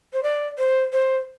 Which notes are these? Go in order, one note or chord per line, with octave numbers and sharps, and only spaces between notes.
C5
D5
C5
C5